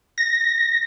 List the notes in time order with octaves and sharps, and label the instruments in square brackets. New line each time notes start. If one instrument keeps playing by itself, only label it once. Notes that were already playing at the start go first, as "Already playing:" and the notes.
[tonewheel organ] A#6